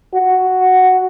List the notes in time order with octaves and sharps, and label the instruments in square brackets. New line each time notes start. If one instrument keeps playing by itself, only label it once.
[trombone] F#4